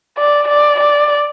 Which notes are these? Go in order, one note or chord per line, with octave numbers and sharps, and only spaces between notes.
D5
D5
D5